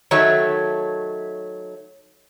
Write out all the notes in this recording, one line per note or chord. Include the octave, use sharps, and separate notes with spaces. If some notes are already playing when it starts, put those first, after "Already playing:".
D#3 F#3 A3 C#5 E5